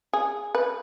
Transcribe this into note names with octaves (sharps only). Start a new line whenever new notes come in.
G#4
B4